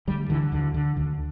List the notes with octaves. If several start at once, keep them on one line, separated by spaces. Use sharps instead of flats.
D2 G3
D3 E3
D2 D3
D3
D2 D3